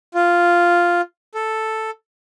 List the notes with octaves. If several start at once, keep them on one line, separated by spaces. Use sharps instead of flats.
F4
A4